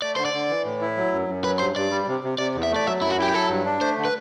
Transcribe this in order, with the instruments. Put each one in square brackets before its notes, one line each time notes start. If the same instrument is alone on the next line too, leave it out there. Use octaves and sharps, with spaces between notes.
[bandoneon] A3 [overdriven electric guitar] D5
[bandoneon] D3 [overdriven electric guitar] C5
[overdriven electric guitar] D5
[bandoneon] D3
E3
A2
E4
F#3
F#2
F#2
[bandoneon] F#3 [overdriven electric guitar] B4
[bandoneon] G2 [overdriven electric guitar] C5
[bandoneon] G2 [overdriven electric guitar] D5
[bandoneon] G3
C3
C3
[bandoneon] C3 [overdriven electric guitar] D5
[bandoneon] E2
[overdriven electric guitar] E5
[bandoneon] A3
[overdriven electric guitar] D5
[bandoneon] F#3 [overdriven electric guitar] E5
[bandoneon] F#2 [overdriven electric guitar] E4
[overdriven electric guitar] F#4
[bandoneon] E4 [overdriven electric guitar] G4
[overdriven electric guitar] G4
[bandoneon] F#3 [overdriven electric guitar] A4
[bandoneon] G2
D4
[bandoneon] A3 [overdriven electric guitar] C5
[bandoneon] D3
[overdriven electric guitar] B4